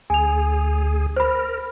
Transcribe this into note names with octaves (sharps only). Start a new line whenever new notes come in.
D2 G#4 G#5 F7
A#4 C5 B5